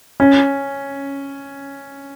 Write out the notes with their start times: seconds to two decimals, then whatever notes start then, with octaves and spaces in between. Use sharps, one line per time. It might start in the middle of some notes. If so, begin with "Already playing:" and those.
0.20 C#4